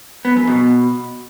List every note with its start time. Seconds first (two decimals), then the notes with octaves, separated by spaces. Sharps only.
0.25 B3
0.36 F#2
0.47 B2